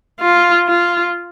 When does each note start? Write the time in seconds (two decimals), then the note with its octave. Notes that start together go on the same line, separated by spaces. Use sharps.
0.20 F4
0.68 F4